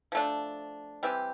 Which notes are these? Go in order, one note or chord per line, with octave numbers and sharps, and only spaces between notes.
F3 A3 D4
E3 G3 C4 G4